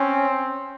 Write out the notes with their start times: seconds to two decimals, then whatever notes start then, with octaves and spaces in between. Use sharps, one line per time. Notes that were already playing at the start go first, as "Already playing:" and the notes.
Already playing: C4 C#4